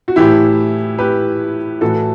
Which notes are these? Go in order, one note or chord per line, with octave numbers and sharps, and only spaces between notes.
F#4
A2 E3 E4 G4
G4 B4
A2 E3 F#4 A4